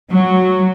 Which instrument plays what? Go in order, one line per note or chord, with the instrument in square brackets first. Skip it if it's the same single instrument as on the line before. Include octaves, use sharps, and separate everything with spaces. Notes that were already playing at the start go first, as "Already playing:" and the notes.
[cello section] F#3